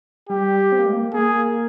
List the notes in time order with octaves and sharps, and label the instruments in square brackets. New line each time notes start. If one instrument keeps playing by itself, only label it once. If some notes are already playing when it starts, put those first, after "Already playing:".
[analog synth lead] G3 [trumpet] G4
[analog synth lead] C4
A#3
G#3
A#3
[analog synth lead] A#3 [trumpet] G#4